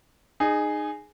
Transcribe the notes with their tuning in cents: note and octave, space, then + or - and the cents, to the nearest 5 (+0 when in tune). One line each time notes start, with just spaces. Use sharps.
D#4 -25 G#4 +0